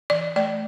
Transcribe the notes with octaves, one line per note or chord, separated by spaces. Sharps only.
E3 D5
A3 D5